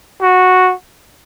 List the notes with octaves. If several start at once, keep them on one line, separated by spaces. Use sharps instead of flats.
F#4